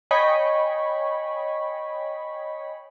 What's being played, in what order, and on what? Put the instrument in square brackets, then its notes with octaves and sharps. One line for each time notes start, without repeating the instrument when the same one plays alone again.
[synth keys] C#5 D#5 G5 G#5 B5 C#6